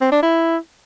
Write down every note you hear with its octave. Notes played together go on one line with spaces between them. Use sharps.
C4
D4
E4